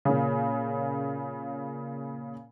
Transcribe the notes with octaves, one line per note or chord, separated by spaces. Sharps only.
A#2 C#3